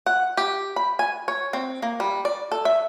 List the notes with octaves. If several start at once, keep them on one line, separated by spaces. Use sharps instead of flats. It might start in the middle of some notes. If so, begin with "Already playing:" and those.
F#5
G4
B5
G#5
C#5
C4
A#3
G3
D5
A4
E5